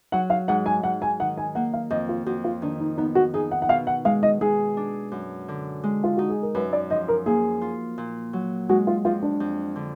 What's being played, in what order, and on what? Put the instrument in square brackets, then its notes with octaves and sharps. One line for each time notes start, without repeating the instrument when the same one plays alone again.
[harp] F#3 [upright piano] F#5
[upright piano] F5
[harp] G#2 [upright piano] F#5
[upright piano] G#5
[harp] G#2 [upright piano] F#5
[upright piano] G#5
[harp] D#3 [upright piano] F#5
[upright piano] G#5
[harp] A#3 [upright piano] F#5
[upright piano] F5
[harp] F2 [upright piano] D#5
[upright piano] F4
[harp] F2 [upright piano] F#4
[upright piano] F4
[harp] D#3 [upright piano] D4
[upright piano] D#4
[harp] B3 [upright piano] D#4
[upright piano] F#4
[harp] D#4 [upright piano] G#4
[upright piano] F#5
F#5
[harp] B2 [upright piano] F5
[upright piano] F#5
[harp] G#3 [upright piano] F5
[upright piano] D#5
[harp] G#3 [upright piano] G#4
[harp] D4
F#2
D3
G#3
[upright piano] F4
[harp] D#4 [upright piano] F#4
[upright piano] G#4
A#4
[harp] F#2 [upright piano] B4
[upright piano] D5
[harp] F3 [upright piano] D#5
[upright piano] A#4
[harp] A#3 [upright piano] G#4
[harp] F4
A#2
F#3
[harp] G#3 [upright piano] F#4
[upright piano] F4
[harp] F2 [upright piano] F4
[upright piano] D4
[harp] F2
D3